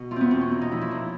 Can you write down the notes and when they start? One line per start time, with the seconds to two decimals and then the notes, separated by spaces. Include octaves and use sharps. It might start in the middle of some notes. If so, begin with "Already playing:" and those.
Already playing: B2
0.11 E2 F4
0.16 B3 C4
0.31 B2 C4
0.41 C#4
0.51 A#2
0.61 D#4
0.71 F3 E4
0.81 E4
0.91 A#2